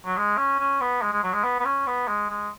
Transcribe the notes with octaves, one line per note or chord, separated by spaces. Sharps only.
F#3
G#3
C#4
C#4
B3
G#3
G#3
F#3
G#3
B3
B3
C#4
B3
G#3
G#3